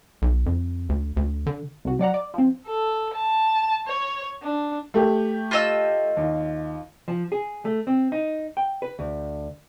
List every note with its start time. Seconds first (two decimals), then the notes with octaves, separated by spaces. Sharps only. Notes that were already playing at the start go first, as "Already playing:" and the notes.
0.22 B1
0.46 F2
0.89 D2
1.16 D2
1.46 D3
1.85 C2 F#4
1.99 F#3 D5 F#5 A#5
2.14 D5
2.34 F3 C4
2.67 A4
3.14 A5
3.87 C#5
4.43 D4
4.94 A3 G4
5.51 F4 D#5 E6
6.17 D#2
7.08 F3
7.32 G#4
7.65 A3
7.87 C4
8.12 D#4
8.57 G5
8.82 B4
8.99 D2